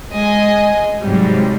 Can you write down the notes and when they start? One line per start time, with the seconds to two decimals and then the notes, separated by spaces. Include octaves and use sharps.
0.10 G#3 D#5 G#5
1.03 G#2 C3 F#3 G3